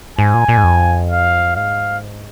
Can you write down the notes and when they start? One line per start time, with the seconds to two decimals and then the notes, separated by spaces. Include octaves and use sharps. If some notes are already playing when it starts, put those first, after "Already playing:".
0.19 G#2 G#5
0.34 A#2
0.49 A#2
0.57 G#2
0.64 F2
1.11 F5
1.56 G#2 F5